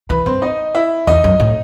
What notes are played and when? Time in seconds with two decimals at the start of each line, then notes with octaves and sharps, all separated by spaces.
0.09 E3 B4 B5
0.26 G2 C4 C5
0.42 D#4 D#5
0.75 E4 E5
1.07 E2 D#4 D#5
1.24 F#2
1.40 A2